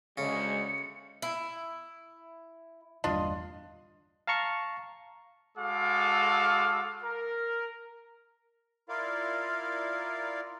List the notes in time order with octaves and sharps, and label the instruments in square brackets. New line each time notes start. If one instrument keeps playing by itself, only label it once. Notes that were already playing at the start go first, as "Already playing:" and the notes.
[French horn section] D2 G#3 [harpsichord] C#3 [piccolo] C#7
[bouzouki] E4
[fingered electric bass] G1 E2 G3 [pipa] D4 F4 D#5
[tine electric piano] F5 A5 A#5 C#6 C#7
[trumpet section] G#3 F#4 A4 F5 D6
A#4
[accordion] E4 F4 A#4 D5 F5